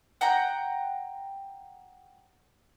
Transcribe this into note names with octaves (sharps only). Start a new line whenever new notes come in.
F#5 G5 A#5 G6